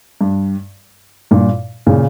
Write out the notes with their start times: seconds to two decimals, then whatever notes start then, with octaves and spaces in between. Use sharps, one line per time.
0.21 G2
1.31 G2 A#2
1.87 A#2 C#3